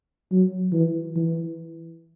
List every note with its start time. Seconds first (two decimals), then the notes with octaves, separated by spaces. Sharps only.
0.32 F#3
0.73 E3
1.16 E3